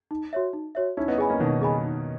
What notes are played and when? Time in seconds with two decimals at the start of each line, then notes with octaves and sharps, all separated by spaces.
0.11 D#4
0.33 F#4 C#5 E5
0.53 D#4
0.75 F#4 C#5 E5
0.97 C#4 D#4 E4
1.08 B3 D#4
1.18 G#4 D#5 G#5 B5
1.30 A#3 C#4
1.40 B2 D#3 D#4
1.61 G#4 D#5 G#5 B5
1.84 D#4